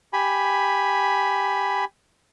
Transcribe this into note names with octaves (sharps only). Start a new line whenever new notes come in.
G4 G#5 B5